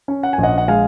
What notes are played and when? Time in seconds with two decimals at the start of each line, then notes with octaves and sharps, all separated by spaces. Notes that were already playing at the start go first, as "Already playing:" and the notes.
0.08 C#4
0.23 F#5
0.33 G#5
0.38 A#1
0.43 D#5 F#5
0.58 F#5
0.68 G#3 F5 G#5